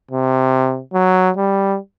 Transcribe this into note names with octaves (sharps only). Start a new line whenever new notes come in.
C3
F#3
G3